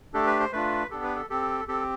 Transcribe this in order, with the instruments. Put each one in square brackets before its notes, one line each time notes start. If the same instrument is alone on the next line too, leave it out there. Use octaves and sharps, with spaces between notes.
[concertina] A3 D4 G4 A4
B4
C5
A3 D4 F4 B4
B3 D4 G4 A4
B4
A4
C4 G4 A4
C4 G4 A4